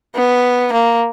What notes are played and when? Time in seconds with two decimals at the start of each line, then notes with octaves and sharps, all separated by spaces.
0.16 B3
0.72 A#3